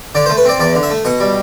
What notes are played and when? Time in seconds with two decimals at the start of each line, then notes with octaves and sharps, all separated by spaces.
0.15 D3 D5
0.26 C5
0.30 A3
0.37 B4
0.45 C4 D5
0.60 E2 D5
0.75 D3
0.83 E5
0.90 A3
1.05 B2 F#5
1.20 G3